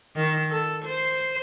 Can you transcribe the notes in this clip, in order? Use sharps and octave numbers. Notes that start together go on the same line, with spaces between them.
D#3
A4
C5